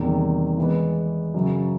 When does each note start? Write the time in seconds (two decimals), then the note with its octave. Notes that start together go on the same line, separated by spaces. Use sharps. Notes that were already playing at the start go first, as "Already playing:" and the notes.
Already playing: E2 C3 D#3 G3 A#3
0.57 E3 G#3 B3
1.34 F#2 C#3 F#3